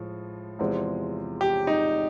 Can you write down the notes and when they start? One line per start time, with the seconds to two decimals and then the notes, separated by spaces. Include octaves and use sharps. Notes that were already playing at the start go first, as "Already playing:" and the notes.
Already playing: A2 F3 G#3
0.59 E2 C3 F3 G#3 C4
1.41 G4
1.67 D#4